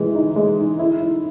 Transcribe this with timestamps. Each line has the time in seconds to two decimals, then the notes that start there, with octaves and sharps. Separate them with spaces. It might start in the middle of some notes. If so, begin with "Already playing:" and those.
Already playing: E3 G#3
0.15 D#4
0.36 G#3
0.58 D#4
0.79 E4
1.00 E4